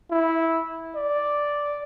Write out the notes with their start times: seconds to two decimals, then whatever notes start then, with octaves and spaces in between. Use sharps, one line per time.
0.11 E4
0.95 D5